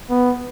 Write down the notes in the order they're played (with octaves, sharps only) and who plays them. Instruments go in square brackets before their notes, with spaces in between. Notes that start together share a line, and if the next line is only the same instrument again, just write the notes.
[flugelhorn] B3